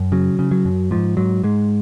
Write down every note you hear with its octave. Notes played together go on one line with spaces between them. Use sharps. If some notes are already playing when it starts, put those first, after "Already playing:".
Already playing: F#2
C#3 F#3
C#3
F#3
F#2
G#2 F3
G#2 F#3
G#2 G#3